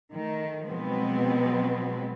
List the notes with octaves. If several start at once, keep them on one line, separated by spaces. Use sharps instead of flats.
D#3 A3
B2 F3 F#3 G#3 B3 C4